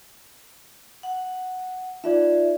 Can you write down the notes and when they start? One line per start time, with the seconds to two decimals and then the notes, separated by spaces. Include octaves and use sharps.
1.03 F#5
2.04 D#4 F4 D5 E5